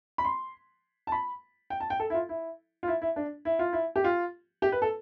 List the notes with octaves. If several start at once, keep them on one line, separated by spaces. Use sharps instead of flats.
B5
C6
A5
B5
G5
A5
G5
A4
E4
F4
E4
F4
E4
E4
D4
E4
F4
E4
G4
F4
G4
B4
A4